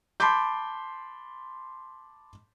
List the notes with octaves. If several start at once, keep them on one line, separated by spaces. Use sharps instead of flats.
A5 B5 C6 D6 G6